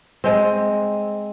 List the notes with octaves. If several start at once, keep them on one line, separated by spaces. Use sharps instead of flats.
G#3 C4